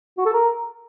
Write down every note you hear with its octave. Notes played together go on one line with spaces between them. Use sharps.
F#4
A4
A#4